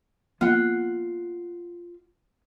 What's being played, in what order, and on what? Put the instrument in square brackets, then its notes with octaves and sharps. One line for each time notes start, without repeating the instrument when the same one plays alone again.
[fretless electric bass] F3 A#3 B3 [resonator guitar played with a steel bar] F4 F#5